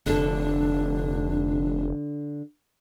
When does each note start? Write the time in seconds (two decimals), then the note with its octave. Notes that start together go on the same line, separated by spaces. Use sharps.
0.06 F1 D3 D4 A4